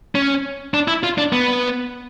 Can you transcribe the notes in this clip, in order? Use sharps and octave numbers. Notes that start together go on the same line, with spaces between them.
C#4
D4
E4
F4
D4
B3